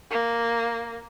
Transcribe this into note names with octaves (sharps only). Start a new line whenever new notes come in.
A#3